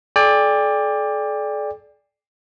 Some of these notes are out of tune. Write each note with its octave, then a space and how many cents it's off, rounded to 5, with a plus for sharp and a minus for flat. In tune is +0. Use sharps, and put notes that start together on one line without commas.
A4 -45 D5 +0 G5 +35